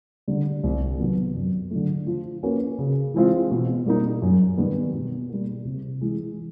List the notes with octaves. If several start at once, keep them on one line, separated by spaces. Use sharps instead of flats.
D3 G3
C2
C3 D#3 F#3 B3
F#2
D3 F#3 A3
F3
A#3 C#4 F#4 B4
C#3
E3 G#3 C4 F4
B2
G3 A#3 D#4
F#2
D#3 G3 B3
B2
G3 A#3
C3
E3 G#3